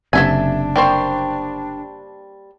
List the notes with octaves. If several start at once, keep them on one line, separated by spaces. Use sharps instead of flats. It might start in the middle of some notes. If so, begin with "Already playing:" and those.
F#1 C3 D4 A4 E5 G#5
G3 A#3 C5 G5 C#6